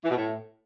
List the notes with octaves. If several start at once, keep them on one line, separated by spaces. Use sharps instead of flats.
E3
B2
A2